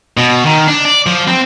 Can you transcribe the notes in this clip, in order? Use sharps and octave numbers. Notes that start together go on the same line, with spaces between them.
B2
D#3
D4
D5
F3
C4